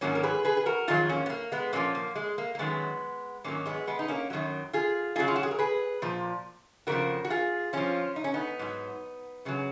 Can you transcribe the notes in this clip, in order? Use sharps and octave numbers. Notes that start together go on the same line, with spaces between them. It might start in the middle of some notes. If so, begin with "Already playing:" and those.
G#2 D#3 F#3 A#3 C#4
A#4
G#4 B4
G#4 B4
G#4
F#4 A#4
F2 D#3 F#3 F4 G#4
A#3 C#4
B3
A#3
G#3 B3
A#2 F3 A#3 C#4
A#3
G#3
A#3
A#3
F#2 D#3 F#3 G#3 B3
G#2 D#3 F#3 A#3 C#4
G#3 B3
G#3 B3
D#4
A#3 C#4
F#2 D#3 F#3
F4 G#4
F#2 C#3 F#3 F4 G#4
F4
F#4
G#4
A#4
G#4 B4
A#2 F3
F2 C#3 F3 F#4 A#4
F#4
F4 G#4
F2 F3 C#4 F4
D#4
C#4
B3 D#4
G#2 F#3
F#2 C#3 F#3